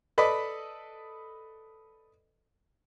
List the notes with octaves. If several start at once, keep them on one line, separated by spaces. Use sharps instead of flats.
A4 B4 D5 D#5 B5